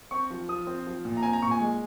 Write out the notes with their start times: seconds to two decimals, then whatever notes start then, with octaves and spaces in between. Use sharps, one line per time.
0.11 C4 C#6
0.30 F3
0.49 F3 D#6
0.67 C4
0.87 F3
1.05 A#2
1.17 A#5
1.23 C4 G#5
1.33 A#5
1.42 A#2 C#6
1.51 G#5
1.61 G#3